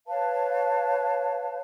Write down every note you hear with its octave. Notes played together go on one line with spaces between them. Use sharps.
B4 C#5 F5 A5